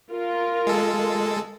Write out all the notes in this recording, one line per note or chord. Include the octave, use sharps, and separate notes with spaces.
F4 A#4
G#3 A4